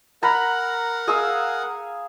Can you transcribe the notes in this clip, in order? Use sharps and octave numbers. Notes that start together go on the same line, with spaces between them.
A#4 F#5 A#5 B5
G#4 F5 E6